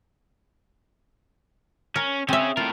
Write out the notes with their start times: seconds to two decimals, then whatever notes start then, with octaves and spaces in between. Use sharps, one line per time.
1.96 C#4 A#4
2.29 C4 C#4 G#4 E5
2.57 A2 F4 A#4